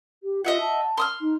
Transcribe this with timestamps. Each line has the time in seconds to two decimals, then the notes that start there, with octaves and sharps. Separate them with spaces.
0.23 G4
0.45 F4 D#5 E5 F#5
0.60 A5
0.98 C6 D#6 F6
1.20 D#4